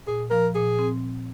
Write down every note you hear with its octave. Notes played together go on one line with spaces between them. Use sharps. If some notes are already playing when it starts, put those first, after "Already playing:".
A#2 G#4
F3 A#4
A#2 G#4
C4